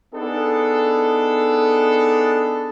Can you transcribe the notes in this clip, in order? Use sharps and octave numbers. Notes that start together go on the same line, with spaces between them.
B3 D4 D#4 G#4 A4